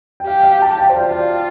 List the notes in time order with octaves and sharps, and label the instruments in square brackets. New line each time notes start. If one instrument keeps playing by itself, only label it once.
[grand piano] G5
[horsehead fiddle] G4 [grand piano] F5
[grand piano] F5
A5
G5
C5
[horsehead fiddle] F4 [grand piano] D5
[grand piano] F5
D5